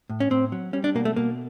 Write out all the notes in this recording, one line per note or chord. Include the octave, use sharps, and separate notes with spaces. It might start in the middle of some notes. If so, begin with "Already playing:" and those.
A2
C#4
A2 C4
F#3
G3 C#4
D4
B2 A#3
A3
B2 A#3